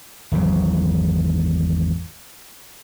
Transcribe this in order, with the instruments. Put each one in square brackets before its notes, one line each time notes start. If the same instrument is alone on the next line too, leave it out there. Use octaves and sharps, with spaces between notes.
[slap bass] G#1 E2 C#3 F#3